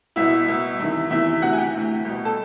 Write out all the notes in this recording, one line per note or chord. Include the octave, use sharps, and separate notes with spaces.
C2 B2 E4 E5
C2 B2
E2 C3 D#3
E2 C3 D#3 E4 E5
D2 C3 E3 F#4 F#5
G#5
G4 G5
D2 C3 E3
C2 B2
A4 A5